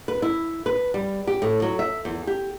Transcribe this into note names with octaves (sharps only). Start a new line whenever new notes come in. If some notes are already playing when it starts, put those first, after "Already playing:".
B4
E4
B4
G3
G4
A2
F#3
E5
E2
G4